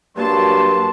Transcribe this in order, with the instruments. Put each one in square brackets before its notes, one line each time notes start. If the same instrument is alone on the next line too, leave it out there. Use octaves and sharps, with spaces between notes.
[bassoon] G2 [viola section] F#3 A5 [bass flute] A#3 [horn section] C6